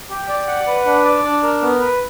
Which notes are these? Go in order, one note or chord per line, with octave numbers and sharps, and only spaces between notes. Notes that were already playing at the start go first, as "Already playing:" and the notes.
G4
D5
F#5
B4
D4
D5
D4
A#4
B3
B4